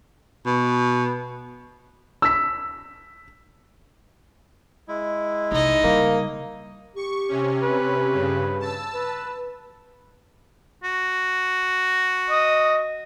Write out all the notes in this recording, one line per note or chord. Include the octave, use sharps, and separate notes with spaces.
B2
E6 B6
G#3 E4
C2 D#4 D#5
C#3 G3 A#3
G4 C#6
C3 C#4
B4
G2 C#3
A5 E6
B4
F#4
D#5